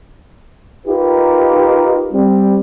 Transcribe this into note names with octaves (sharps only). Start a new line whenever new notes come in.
D#4 F4 G4 A#4 B4
G3 C4